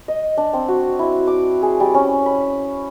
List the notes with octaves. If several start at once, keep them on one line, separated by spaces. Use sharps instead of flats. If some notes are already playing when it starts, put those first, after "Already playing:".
D#5
D4
C4
F#4
E4
D6
G#4
G3
C#4
B5